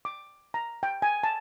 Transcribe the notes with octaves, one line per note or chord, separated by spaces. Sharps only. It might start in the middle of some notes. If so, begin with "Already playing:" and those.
D6
A#5
G5
G#5
A5